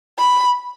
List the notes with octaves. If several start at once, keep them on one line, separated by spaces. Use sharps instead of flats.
B5